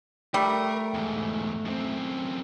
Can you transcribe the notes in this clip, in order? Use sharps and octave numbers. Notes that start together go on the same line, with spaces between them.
G3 A3 A#4
E2 G#2
F#2 C4